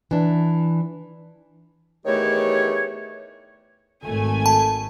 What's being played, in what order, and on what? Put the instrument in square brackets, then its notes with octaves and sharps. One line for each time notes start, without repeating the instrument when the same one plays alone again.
[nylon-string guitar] E3 D4
[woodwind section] E2 D#3 A3 G4 C#5
[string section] G#1 A3 G#5
[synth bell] A5